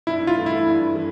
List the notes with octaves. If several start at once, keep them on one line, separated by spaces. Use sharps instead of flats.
G2 E4
F4
E3 A3
E4
G2
E3